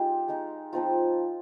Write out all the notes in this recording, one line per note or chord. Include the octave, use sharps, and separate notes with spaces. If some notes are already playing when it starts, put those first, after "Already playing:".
Already playing: G#3 D#4 F4 G4
G#3 D#4
F3 C4 D#4 F4